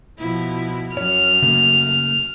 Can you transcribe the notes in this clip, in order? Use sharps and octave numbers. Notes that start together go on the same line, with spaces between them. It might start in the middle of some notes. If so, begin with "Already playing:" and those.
B2 F3 E4
F#2 C#5 F6
C#3 A3 A#3